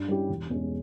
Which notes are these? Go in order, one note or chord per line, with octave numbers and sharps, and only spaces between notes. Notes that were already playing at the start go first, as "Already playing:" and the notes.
Already playing: G2
G3 C#4 E4 G4
E1
E2 B2 G#3 C#4